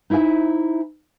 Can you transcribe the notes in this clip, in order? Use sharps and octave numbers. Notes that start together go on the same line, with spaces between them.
D#4 E4 C5 E5 G#5